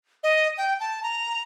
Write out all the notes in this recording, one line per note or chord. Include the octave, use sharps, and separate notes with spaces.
D#5
G5
A5
A#5